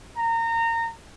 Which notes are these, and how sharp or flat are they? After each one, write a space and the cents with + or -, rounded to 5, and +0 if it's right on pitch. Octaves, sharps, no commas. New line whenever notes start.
A#5 -25